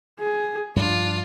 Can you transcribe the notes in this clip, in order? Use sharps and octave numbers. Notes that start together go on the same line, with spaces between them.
G#4
G2 F3 D4 F4